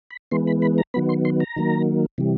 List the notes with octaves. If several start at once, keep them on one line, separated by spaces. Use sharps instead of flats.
B5
E3 G#3 B3 C6
B5
B5
A#5
D#3 F#3 B3 B5
C6
C6
A#5
D#3 F#3 A#3
C3 E3 G3